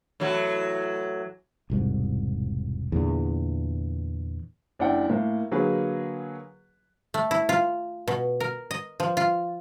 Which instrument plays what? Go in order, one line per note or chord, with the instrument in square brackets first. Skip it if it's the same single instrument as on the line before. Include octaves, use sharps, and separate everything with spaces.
[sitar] A2 E3 F#3
[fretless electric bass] E1 C2 G#2
E2 A#2 D3
[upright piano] F#1 D4 E4 F#5 G5
A2 A#3
D3 F#3 A#3 G#4 B4
[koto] A3
E4
F4
B2
A#4
D#5
F3
F4